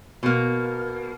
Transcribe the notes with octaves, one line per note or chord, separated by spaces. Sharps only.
B2 A#3